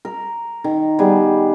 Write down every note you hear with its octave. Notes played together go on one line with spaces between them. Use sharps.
A#4
D#3
G3 B3 G#4